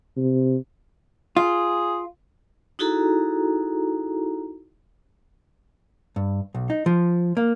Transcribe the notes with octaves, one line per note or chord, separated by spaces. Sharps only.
C3
F4 G#4
D#4 E4 F#4 G#4 A4 A#5
G2
B1
D#4
F3
A#3